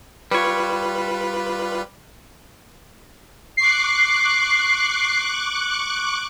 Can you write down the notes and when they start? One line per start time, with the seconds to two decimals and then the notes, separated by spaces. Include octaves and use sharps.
0.31 G3 F4 B4 C#5
3.57 C#6 D6 F#6 C7